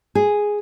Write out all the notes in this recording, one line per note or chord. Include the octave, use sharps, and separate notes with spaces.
G#4